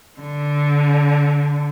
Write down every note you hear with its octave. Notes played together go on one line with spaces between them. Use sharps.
D3